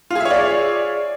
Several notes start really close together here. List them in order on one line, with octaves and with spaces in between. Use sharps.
F4 G#4 E5 C#5 D5